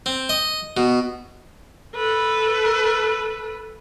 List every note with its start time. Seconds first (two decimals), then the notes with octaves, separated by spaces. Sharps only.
0.06 C4
0.29 D#5
0.77 B2
1.95 A4 B4